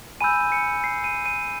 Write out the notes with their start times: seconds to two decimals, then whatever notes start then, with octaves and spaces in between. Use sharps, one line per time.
0.21 G#5 B5 E6 G6 D#7
0.52 C#7
0.84 C7
1.04 D#7
1.26 D#7